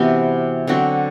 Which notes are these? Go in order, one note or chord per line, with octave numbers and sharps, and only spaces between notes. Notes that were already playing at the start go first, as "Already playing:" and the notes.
Already playing: C3 E3 B3 F#4
D3 F#3 C4 F#4